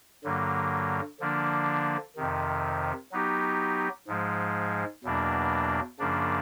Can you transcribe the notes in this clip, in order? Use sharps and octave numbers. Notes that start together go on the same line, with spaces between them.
G2 D3 F#3 A#3
D3 F3 A#3 D4
F2 C3 D#3
F#3 B3 D#4 G4
G#2 F3 G#3
E2 B2 F#3 A#3 D4
F#2 C#3 F3 A#3 D4